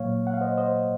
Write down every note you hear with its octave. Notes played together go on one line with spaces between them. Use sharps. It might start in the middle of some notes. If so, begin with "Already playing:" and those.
Already playing: A#2 F#3 A#3 C#5 F5
F#5
F5
C5 D#5
C5 D#5